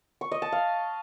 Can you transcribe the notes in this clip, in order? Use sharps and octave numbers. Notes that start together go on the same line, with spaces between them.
C#6
D#5
A5
F5